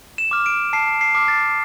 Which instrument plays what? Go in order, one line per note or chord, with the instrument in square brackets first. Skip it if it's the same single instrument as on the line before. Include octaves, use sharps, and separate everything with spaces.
[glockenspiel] E7
D6 F6
D7
A5 C7
C7
D6 F6
A6